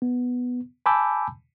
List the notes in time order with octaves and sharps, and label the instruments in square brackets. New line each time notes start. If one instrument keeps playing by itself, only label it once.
[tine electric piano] B3
G#5 A5 B5 D6 E6 G6